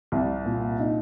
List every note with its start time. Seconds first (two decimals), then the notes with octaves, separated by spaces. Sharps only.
0.12 C2
0.46 A#2
0.80 D#4